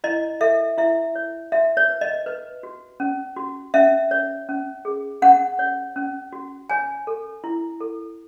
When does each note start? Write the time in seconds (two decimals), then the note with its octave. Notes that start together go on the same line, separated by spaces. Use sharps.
0.04 E4 D#5
0.41 A4 E5
0.78 E4 E5
1.15 C#5
1.52 F#4 E5
1.77 C#5
1.89 B4
2.01 D#5
2.26 B4
2.63 F#4
3.00 C#4
3.37 F#4
3.74 C#4 E5
4.11 C#5
4.49 C#4
4.85 G#4
5.22 C#4 F#5
5.59 C#5
5.96 C#4
6.33 F#4
6.70 C#5 G#5
7.07 A4
7.44 E4
7.81 A4